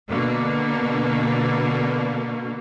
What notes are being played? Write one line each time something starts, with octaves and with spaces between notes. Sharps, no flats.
B2 D3 A#3